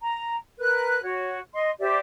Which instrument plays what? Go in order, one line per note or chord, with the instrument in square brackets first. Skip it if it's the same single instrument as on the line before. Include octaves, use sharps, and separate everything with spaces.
[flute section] A#5
A#4 B4 F#6
F#4 C#5
D#5 C6
G4 C5 D5 E5